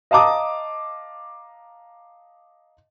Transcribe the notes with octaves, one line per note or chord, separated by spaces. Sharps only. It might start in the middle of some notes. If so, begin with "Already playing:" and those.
D#5 F5 A5 A#5 D6 D#6